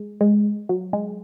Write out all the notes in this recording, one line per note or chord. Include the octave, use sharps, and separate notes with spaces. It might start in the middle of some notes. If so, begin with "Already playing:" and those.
Already playing: G#3
G#3
F#3
G#3